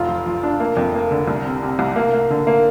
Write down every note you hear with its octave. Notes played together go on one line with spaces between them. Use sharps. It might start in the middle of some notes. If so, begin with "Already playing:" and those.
Already playing: F1 F4
F3
F3
D4
A#3
F2
A#3
D3
C2
C3
C3
C2
A#3
A#3
D3
A#3